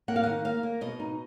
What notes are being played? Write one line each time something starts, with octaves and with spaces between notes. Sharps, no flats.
A#3 F#5
F5
F#5
D#3
A#3 F5
A#3
B2 D#5
D#4